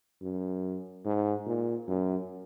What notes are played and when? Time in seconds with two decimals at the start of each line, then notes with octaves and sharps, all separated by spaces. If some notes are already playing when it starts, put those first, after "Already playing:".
0.22 F#2
1.05 G#2
1.47 A#2
1.88 F#2